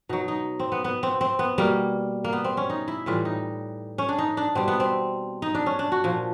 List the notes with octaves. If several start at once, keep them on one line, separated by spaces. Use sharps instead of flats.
B2 F#3 D#4
D#4
C4
B3
B3
C4
C4
B3
B2 G3 A#3
A#3
B3
C4
C#4
D#4
E4
A2 E3 G3 F4
D#4
C#4
D4
D#4
D4
B2 G3 C4
B3
C4
D#4
D4
C#4
D4
F#4
A#2 F3